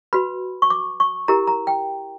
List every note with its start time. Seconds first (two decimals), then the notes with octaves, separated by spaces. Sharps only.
0.13 F#4 B4 B5
0.62 C#6
0.70 D6
1.00 C#6
1.28 E4 G4 A#4 A#5
1.47 A#5
1.67 G5